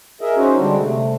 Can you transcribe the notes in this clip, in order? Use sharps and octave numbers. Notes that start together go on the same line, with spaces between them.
G#4 A#4 D#5 E5
C#4 D#4 F#4 C5
D3 G3 G#3 C4 D4
C3 A3